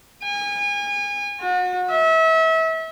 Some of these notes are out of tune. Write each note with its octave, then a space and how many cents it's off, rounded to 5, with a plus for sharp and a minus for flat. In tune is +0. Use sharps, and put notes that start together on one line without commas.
G#5 -30
F#4 -35
E5 -30